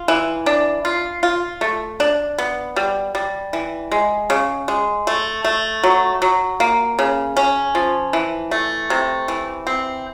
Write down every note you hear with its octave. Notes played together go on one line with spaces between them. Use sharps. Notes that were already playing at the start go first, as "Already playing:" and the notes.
Already playing: F4
E3
D4
F4
F4
A3
D4
B3
G3
G3
E3
G#3
C#3
G#3
A3
A3
F#3
F#3
A#3
C#3
C#4
F3
E3
A3
C3
E3
C4